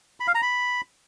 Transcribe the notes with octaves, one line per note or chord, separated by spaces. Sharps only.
B5
F5
A#5
B5